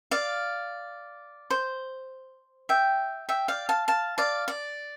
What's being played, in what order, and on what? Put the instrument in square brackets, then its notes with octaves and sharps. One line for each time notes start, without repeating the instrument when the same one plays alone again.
[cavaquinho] D5 F5
C5
E5 G5
E5 G5
D5 F5
F5 A5
F5 A5
D5 F5
D5